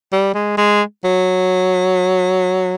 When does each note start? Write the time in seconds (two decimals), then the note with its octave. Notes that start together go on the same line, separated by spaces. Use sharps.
0.12 G3
0.34 G#3
0.58 G#3
1.05 F#3